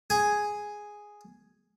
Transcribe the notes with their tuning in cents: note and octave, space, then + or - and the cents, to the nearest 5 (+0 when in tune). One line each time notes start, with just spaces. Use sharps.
G#4 +0 G#5 +0